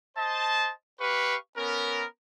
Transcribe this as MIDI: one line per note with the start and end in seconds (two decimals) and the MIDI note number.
0.17 0.71 72
0.17 0.71 75
0.17 0.71 81
1.00 1.36 67
1.00 1.36 71
1.00 1.36 77
1.00 1.36 85
1.57 2.04 59
1.57 2.04 61
1.57 2.04 70